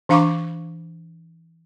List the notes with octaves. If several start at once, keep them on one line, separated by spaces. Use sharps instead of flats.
E3 D4 F5 B5 C#6 D6